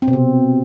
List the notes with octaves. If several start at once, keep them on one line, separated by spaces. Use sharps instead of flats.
C4
B2
C3